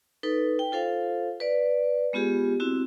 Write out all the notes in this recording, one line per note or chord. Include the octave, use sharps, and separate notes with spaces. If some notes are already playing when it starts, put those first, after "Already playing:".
D#4 A4 B4
G5
F4 A4 C5 F5
B4 D5
G#3 B3 F4 G4 G#4
C4 E4 F#4